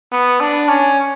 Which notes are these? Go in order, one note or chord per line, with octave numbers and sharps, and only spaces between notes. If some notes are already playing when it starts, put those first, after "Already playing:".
B3
D4
C#4